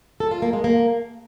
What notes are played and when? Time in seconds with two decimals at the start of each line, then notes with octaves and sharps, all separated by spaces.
0.20 A4
0.31 F4
0.42 A#3
0.53 G#3
0.64 A#3